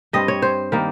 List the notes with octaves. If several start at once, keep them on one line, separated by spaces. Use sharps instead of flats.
G2 G3 C4 D#5
C#5
C5
D#3 G3 A#3